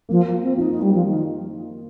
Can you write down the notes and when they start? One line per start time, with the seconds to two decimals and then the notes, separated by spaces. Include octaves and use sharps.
0.09 F3 A#3
0.25 A#3
0.42 C4
0.57 D#4 F4
0.70 D#4
0.81 G3
0.93 F3
1.05 D#3